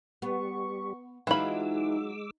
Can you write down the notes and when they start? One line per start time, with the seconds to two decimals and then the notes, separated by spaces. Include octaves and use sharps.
0.22 G3 B3 G4 C#6
1.27 E3 F#3 G#3 D#4 F4 B5 D6 E6